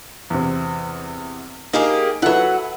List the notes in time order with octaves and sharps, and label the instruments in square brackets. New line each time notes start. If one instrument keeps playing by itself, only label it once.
[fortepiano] E2 C3
[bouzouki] A#3 G4 G#4 [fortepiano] D#4
[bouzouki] F#3 F#5 [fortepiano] E4 A4 B4